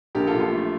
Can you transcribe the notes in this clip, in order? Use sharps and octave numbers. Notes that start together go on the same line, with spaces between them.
A#1 G4 A#4
F4 A4
A#1
F4 A4
A3